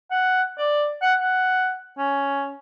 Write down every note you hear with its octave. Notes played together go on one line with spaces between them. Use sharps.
F#5
D5
F#5
F#5
C#4